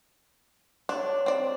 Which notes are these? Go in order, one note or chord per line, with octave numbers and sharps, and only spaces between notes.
D4 B4 C#5 A5
C4 D5